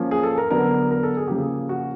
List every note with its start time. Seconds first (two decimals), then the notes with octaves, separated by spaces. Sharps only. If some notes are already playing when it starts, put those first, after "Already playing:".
Already playing: F3 A#3 C#4
0.11 G#4
0.23 A4
0.38 A#4
0.50 D3 F#3 B3 D4 A#4
0.91 A#4
1.03 A4
1.17 G#4
1.28 C#3 F3 A#3 G4
1.37 G#4
1.69 F#4